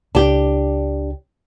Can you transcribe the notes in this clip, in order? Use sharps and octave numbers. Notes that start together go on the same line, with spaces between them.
C#2 D4 G4